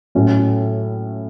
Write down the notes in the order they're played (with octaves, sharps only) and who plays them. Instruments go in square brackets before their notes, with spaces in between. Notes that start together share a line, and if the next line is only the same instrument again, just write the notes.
[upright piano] A2 F#3 C#4